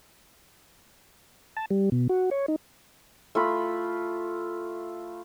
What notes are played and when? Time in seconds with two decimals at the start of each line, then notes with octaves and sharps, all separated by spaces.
1.57 A5
1.71 G3
1.92 B2
2.09 F#4
2.31 C#5
2.48 D#4
3.35 A3 F4 B5